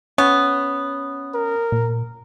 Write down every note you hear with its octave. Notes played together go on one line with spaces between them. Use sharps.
B3 C#4 C#5
A#4
A#2